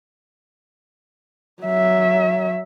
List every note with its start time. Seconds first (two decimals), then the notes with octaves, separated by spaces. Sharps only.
1.63 F#3 E5